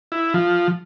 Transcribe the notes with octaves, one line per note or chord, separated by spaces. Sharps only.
E4
F3